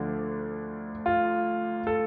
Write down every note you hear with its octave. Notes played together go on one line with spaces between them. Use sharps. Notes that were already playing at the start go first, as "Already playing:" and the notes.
Already playing: D2 D3 F3 D4
F4
A4